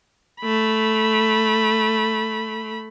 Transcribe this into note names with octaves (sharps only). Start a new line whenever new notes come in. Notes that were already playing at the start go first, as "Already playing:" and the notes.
A3 B5